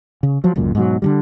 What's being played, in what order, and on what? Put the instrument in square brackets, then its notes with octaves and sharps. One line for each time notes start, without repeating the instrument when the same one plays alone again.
[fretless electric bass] C#3
F3 F#3
D1 C#2 F#2 A#2
G#2 B2 F#3
D3 D#3 G3